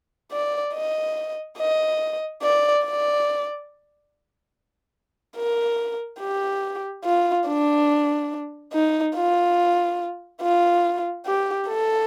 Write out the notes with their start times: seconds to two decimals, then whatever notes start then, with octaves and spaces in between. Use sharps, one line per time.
0.32 D5
0.74 D#5
1.58 D#5
2.42 D5
2.85 D5
5.36 A#4
6.21 G4
7.05 F4
7.47 D4
8.73 D#4
9.15 F4
10.42 F4
11.26 G4
11.68 A4